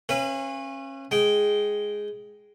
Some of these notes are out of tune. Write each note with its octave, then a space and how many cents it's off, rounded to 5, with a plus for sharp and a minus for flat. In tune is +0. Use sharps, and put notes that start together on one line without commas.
C#4 -30 B4 +0 F5 -35
G#3 +0 G5 -15